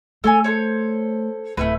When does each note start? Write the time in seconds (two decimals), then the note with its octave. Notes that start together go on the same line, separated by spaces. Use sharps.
0.24 A3 A4 C#5 G#5
0.44 A4 C5 C#5
1.57 D1 A3 E4 B4